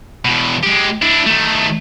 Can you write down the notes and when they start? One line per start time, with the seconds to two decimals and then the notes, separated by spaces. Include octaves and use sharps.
0.25 E2 B2
0.63 G#3 G4
1.02 D4 E4
1.26 D#3 A3